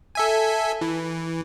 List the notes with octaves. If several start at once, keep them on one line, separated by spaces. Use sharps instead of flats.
A4 E5 G#5
E3